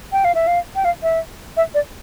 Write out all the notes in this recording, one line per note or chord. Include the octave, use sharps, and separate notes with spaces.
G5
F5
E5
F5
G5
F5
E5
E5
D5